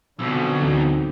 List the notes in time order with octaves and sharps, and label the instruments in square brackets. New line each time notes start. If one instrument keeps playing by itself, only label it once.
[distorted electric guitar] B1 B2 [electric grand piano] F2 C4 E6 [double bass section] D3
[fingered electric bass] D1 E3 C#4 [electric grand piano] C4 D#4 F#4